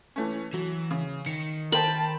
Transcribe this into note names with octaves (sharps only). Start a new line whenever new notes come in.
E3 A3 C#4
E3 F#3
C#3
D#3 C#7
A#4 C5 G5 A5 B5